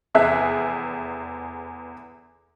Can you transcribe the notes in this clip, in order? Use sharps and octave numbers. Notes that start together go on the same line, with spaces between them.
F1 E2 G#4 E5 F#6